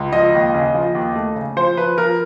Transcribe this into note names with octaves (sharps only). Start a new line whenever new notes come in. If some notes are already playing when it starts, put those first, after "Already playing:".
Already playing: C#2
F3 D#5
D#2
C#3
F3
D#2
A3
C#3
F3 C5
F3 B4
F3 A#4